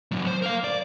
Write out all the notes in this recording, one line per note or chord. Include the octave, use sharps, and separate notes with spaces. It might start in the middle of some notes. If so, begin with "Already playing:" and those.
A2 F#3
C5
A#4 F5
D5